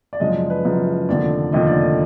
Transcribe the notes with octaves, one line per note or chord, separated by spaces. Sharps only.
D5
F#1 F#2 F3 G#3 D#5
D5
B4
F#1 F#2 F3 G#3
F1 D#2 D3 F3 D5
F1 D#2 D3 F3 D#5
D5